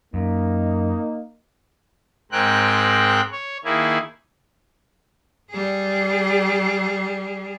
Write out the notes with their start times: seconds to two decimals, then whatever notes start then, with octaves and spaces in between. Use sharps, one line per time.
0.14 F#2 A#3 D#4
2.32 G#2 G#3 C4 A#4 G5 F#6
3.31 C#5
3.64 D#3 A#3 E4 G#4
5.51 G3 G#4